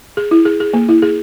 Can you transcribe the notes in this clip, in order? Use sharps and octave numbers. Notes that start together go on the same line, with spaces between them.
G#4
E4
G#4
G#4
A#3
E4
G#4